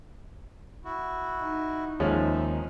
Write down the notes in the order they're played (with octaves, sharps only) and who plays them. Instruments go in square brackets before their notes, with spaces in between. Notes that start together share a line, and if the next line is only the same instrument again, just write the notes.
[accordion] E4 F#4
[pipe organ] D#4
[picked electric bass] D#2 [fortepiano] F3 G#3 C#4 [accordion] E5